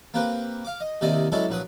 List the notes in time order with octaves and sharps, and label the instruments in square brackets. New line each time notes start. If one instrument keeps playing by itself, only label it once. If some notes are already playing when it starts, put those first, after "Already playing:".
[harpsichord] A#3 C4 G4 B4
F5 D6
D#5
D#2 C3 D#3 E4 D5 D#5
F#3 G#3 C#4 E4 A4 D5
A#1 F#3 B4 D#6